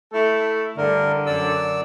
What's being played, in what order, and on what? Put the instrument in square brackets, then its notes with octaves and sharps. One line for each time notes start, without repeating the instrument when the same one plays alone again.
[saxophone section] A3 E4 A4
[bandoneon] G2 A#4 [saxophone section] D3
[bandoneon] F#2 D5 E6